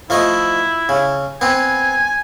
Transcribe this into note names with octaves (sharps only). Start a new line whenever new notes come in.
F3 A3 E4 D#5
C#3
B3 C4 G#5